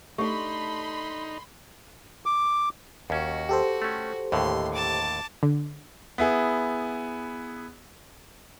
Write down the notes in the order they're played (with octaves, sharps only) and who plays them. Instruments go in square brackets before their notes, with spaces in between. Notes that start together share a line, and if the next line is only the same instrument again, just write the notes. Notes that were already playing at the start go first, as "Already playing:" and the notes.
[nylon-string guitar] A3 D4 [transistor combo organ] D#4 [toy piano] G4 [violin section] B5 C6
[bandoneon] D6
[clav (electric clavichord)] D#2 C#4 [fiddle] F#4
[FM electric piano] G4 A4 C5
[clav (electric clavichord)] A3 C#4
[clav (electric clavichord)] D#2 A2 D3 [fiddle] C6
[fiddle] A5 D6
[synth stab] D3
[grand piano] B3 E4 G#4